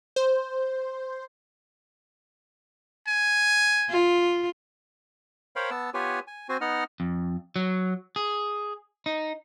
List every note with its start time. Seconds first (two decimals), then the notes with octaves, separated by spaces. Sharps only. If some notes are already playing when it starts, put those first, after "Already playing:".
0.16 C5
3.08 G#5
3.90 F4
5.56 A#4 C5 C#5 F5 G5 B5
5.71 B3 A5 E6
5.94 B3 F4 G4 B4 C#5 G#5
6.27 G#5
6.49 C4 F#4 C5 G#5
6.61 B3 D#4 D#5 F#5 F6
7.00 F2
7.56 F#3
8.16 G#4
9.06 D#4